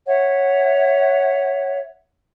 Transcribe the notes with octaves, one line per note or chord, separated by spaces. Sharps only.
C#5 E5 F#5